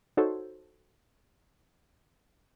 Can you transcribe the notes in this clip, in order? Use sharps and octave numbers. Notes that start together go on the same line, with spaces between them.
D#4 F#4 A4 C5 C#5